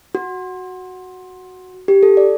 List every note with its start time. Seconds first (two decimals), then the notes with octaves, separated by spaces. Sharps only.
0.15 F#4
1.88 G4
2.03 A4
2.17 D5